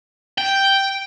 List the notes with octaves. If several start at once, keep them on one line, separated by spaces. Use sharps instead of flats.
G5